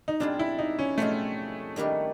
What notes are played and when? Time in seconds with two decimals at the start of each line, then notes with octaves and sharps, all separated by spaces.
0.08 D#4
0.20 B2 G3 C4 D4 F4 G#4
0.39 E4
0.59 D#4
0.79 C#4
0.98 B2 G3 A3 C4 F4 G#4
1.76 D#3 G3 A#3 D4 G4